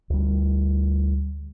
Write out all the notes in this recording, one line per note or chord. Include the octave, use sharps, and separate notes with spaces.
D2 G3